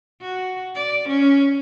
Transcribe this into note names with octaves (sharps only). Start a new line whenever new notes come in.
F#4
D5
C#4